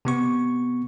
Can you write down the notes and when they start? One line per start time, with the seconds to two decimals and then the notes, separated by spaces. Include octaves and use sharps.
0.05 C3 B3 C#6